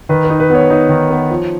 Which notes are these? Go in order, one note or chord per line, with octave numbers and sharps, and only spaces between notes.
D#3 B4
B4
D#4
B4
B3 C#5
D#4
D#3
B3
F3